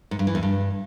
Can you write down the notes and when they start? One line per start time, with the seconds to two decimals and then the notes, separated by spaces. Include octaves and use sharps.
0.11 G#2
0.19 G2
0.27 E3
0.35 E2
0.43 G2